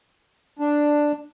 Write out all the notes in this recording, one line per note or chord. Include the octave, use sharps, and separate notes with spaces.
D4